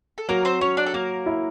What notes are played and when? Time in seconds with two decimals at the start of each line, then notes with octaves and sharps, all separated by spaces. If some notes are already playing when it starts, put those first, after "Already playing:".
0.18 A4
0.29 F#3 A#3 A#4
0.45 C4 C5
0.61 F#3 C#4 C#5
0.77 D4 D5
0.86 A4
0.94 F#3 A#3 A#4
1.26 E4